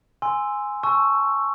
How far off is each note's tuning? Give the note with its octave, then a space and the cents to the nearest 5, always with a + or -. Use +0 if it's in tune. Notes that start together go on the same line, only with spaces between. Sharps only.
G#5 +0 C6 +0 E6 +0
A5 -20 C#6 +0 E6 +10